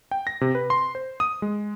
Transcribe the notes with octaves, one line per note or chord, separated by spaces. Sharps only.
G5
A#6
C3
B4
C6
C5
D#6
G#3